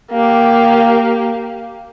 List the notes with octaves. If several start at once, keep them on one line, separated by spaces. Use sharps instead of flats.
A#3 G4